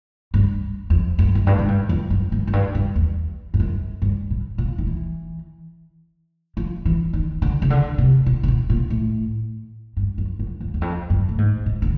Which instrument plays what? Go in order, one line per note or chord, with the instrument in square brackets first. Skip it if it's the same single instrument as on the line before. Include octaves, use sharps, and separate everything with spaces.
[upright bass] G2
F2
F#2
F#2
G2
G#2
G2
F2
F#2
G2
F#2
G2
G2
E2
G2
F#2
G2
A2
A#2
D#3
E3
F3
E3
D#3
D3
C#3
D3
C3
B2
C3
B2
A#2
A2
G2
F#2
F#2
F2
E2
F2
F#2
A2
G#2
A2
D3